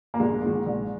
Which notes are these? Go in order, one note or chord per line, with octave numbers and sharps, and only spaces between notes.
A#3
A#1 G#3
G#2 D#3
A#1